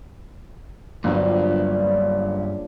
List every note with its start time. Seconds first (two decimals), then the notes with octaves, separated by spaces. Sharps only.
1.04 G1 G2 A#2 F3 F#3 D4
1.68 C#3 D4